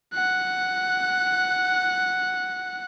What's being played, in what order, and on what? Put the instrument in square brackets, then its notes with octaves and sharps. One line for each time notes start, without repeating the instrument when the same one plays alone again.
[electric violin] F#5 F#6